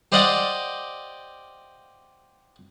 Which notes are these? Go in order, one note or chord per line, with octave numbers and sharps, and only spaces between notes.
G4 C5 D5 D#5 F5 F#5